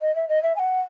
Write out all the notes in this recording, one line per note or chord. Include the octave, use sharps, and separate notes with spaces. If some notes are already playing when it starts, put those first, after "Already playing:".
D#5
E5
D#5
E5
G#5
F#5